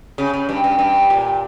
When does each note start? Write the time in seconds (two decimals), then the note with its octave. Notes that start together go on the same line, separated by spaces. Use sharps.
0.18 C#3
0.34 C#3
0.49 G2
0.64 G2
0.79 G2
1.10 A#2